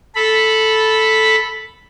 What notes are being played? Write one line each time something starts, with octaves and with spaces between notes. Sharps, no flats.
A4 B5